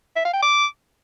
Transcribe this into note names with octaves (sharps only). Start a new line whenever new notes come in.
E5
F5
G5
D6